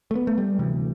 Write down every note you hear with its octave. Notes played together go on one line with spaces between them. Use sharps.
A3
B3
A3
G3
D2 C3 E3